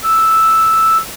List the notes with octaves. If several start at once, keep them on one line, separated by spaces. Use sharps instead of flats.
E6